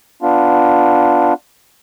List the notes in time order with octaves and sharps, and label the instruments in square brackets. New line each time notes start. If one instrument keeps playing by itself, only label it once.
[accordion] B3 D4 F4